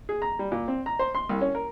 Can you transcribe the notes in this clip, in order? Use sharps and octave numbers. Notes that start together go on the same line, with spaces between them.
G#4
A#5
G3
A#2
C4
A#5
C5
C6
C2
C#4
A#4